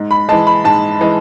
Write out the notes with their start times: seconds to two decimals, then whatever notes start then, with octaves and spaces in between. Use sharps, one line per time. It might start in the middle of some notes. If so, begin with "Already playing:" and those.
Already playing: G#2
0.11 B5
0.29 G#3 A5
0.32 E3
0.47 B5
0.64 G#2 A5
1.01 E3 G#3